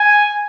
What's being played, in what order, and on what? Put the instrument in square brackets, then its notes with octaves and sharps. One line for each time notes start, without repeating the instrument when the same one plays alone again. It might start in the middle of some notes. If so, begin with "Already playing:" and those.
Already playing: [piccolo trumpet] G#5